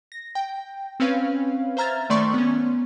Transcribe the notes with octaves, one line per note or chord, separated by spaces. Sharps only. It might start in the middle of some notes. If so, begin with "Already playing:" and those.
A#6
G5
C4 C#4 B4 F5
C5 E5 A#5 F6 G#6 A6
D#3 A3 D5 C6 C#6
B3 C#4